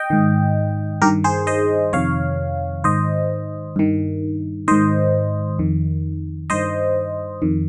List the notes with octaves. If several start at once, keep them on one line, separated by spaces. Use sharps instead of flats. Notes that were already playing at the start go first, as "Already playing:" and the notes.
Already playing: D#5 G5
G#2 D#3
G2 D#3 G4 A#4
G#4 C5
C5 D#5
F2 C3 D#3 C#5 F5
G#2 D#3 C5 D#5
G2 D#3
G#2 D#3 C5 D#5
F2 D#3
G2 D#3 C5 D#5
F2 D#3